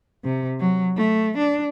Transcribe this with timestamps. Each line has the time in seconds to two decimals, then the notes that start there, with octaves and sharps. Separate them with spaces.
0.24 C3
0.60 F#3
0.97 A3
1.38 D4